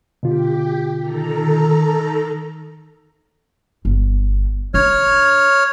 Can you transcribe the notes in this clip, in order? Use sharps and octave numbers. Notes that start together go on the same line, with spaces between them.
B2 D3 F4 G4
D#3 A4 A#5
G1
D4 C#5 F6